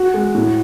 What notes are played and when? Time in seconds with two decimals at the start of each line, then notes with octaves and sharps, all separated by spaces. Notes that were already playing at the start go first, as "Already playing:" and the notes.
Already playing: F#4
0.14 G#3
0.35 A2